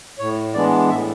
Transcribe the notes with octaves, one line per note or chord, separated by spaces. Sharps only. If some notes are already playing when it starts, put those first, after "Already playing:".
A2 C#5
E3 G#3 B3 D4 D5
A2 E5